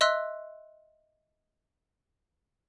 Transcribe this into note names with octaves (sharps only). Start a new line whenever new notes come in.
D#5 E5 C6 E6 F#6